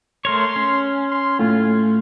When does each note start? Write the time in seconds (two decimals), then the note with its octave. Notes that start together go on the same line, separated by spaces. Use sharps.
0.25 A3 A#4 C#5 C6
0.56 C#4
1.11 C6
1.39 A2 F4